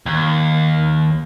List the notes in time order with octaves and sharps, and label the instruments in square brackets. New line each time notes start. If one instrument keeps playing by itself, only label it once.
[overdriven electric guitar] D#2